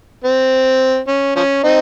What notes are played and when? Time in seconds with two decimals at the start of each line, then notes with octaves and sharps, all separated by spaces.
0.24 C4
1.08 C#4
1.36 F3 C#4
1.63 C4 D#4